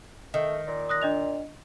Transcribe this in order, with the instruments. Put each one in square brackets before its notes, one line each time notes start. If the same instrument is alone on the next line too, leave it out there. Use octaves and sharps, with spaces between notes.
[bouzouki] D#3 [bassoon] A3
[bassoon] A#2
[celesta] D#6 F#6 A#6
D4 D#5 F7